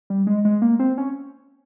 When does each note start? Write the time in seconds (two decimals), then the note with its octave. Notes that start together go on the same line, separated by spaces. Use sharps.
0.10 G3
0.27 G#3
0.45 G#3
0.62 A#3
0.79 C4
0.98 C#4